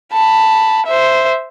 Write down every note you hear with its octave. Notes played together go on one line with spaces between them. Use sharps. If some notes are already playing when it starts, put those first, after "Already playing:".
A5 B5
C5 E5